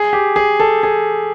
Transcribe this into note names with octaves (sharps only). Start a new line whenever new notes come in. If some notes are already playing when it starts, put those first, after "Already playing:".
Already playing: G#4
G4
G#4
A4
G#4